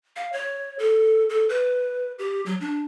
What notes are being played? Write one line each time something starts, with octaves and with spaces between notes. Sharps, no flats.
F5
C#5
A4
A4
B4
G4
F#3
D4